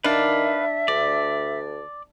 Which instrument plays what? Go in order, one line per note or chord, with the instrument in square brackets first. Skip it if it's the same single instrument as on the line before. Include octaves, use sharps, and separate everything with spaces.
[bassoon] D#3 [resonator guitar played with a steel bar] D4 [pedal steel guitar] B4 F5 [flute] E5
[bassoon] D2 [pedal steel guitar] D5